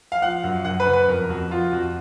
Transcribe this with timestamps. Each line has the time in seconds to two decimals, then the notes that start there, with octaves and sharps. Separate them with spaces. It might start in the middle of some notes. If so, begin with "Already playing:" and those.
0.12 F5
0.22 F3 F#5
0.44 F#2
0.65 F#2 F#5
0.80 B4
0.87 C#3
0.93 B4
1.08 F2 A#4
1.29 F2 F#4
1.51 F3 F4
1.72 F2 F#4